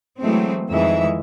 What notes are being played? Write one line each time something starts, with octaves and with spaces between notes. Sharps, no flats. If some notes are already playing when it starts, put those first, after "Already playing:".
E3 F#3 G#3 A3 C4
F2 D#3 E3 G#3 E5